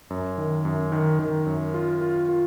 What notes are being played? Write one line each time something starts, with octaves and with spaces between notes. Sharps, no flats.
F#2
D#3
F#2
D#3
D#3
F#2
F4
F4
F4